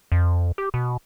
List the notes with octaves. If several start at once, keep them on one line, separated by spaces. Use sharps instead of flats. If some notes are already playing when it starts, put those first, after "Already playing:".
F2
G4
B2